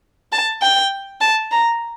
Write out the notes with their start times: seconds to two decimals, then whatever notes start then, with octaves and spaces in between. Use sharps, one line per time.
0.32 A5
0.62 G5
1.21 A5
1.52 A#5